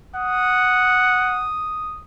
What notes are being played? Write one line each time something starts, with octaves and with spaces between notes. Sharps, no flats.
F#5 D#6